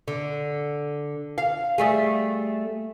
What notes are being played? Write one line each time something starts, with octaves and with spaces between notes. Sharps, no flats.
D3
F5
G3 A3 G#4